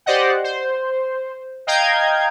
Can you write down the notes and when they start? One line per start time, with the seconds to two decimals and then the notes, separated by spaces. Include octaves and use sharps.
0.06 G4 C5 D5 D#5 F#5
0.44 C5
1.67 D#5 F5 G5 A#5 G6 G#6